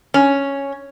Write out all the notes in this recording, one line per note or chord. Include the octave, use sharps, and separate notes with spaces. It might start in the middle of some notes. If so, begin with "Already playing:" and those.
C#4